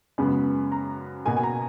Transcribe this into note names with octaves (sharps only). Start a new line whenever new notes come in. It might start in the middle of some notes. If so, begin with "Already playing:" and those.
F#2 C#3 G#3 B3
A#5
B2 A#3 G#5
G#5
A#5